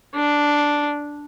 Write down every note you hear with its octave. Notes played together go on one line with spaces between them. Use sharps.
D4